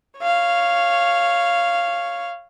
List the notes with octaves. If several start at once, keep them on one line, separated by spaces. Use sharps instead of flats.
C#5 F5